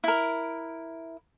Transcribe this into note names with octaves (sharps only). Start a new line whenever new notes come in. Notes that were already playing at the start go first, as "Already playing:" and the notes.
E4 A#4